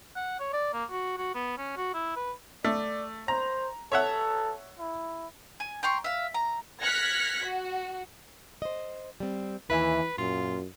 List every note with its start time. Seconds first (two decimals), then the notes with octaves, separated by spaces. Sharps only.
0.16 F#5
0.40 C#5
0.53 D5
0.73 A#3
0.91 F#4
1.18 F#4
1.35 B3
1.58 C#4
1.77 F#4
1.94 E4
2.16 B4
2.64 A3 D5
3.28 C5 A#5
3.92 A4 C#5 E5 F#5
4.79 E4
5.60 G#5
5.83 G5 A#5 C6 C#6
6.04 E5 F5
6.34 A#5
6.82 F6 F#6 G#6 A#6 B6 C#7
7.42 F#4
8.62 C5 D#5
9.20 G3 C4
9.70 D#2 E3 B4 E5 G#5
10.18 F#2 A#2 F4